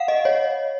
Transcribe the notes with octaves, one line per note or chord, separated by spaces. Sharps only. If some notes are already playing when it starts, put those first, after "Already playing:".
Already playing: F5 F#5
D#5
C#5